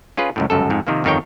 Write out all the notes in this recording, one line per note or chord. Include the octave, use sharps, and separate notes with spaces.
C#4 F4 G#4 B4
C#2 F#2 A2
G1 C#2 F#2 A4
F2 G#2
C3 D#3 F3 A#3
G1 F2 D#3 D#4 C#5 G5